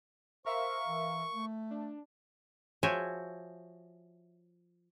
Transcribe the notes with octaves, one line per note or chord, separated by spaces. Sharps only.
A#4 C5 E5 F5 C#6
E3
A3
D4
F3 F#4 C#5 E5 G5 G#5